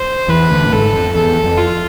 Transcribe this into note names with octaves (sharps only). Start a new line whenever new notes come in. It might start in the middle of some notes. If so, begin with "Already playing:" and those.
Already playing: C5
E2 E3 B4
D2 D3
A2
G#1 G#2 A4
F2
E2 A4
F2
F4